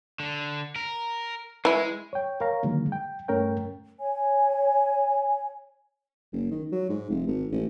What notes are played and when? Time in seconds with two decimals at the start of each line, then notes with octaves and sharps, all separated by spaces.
0.20 D3
0.76 A#4
1.65 E3 G#3 E4
2.13 C#5 G5
2.40 A#4 C#5 F5 A#5
2.63 D3 D#3 F#3 G#3 A#3
2.92 G5
3.28 G2 A3 C#4 A#4 C#5 G5
3.99 C#5 G#5
6.33 F#1
6.51 D#3
6.72 F#3
6.89 G#2
7.10 F1
7.27 G#1
7.52 A1